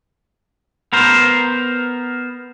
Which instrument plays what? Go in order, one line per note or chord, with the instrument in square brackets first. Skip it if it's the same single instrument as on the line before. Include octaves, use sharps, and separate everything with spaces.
[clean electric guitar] B3 A#4 C5